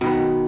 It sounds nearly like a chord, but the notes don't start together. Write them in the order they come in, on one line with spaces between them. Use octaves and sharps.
B2 D#3 B3